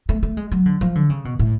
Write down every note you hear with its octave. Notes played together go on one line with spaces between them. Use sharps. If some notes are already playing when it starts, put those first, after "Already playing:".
A3
A3
G#3
F#3
D3
F3
D3
C#3
B2
A2